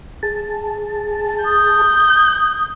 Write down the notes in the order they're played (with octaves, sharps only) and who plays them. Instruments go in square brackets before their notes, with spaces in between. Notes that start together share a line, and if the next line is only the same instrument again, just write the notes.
[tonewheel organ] G#4 A5
[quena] D#6 [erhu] G6